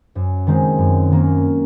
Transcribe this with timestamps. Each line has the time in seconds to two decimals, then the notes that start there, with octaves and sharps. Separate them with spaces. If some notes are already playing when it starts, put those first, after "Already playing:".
0.15 F#2
0.47 D#3 G#3 C4
0.79 F#2
1.11 D#3 A#3 C#4